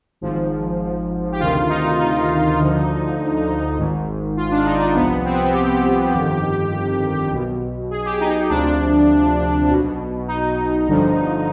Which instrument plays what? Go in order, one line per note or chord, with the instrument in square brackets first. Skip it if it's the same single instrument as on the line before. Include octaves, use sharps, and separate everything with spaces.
[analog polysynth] G#1 G#2 F3
G4
D2 C3 D#3 F4
D#4
D#4
D2 D3 F3
G#1 G#2 D#3
F4
D4
D#4
D4
C2 C3 F3 B3
C4
B3
C4
G4
G1 F2 D#3
B1 B2
G#4
G4
D#4
D2 C3 F3 D4
B1 B2
D#4
G1 G2 D3 F3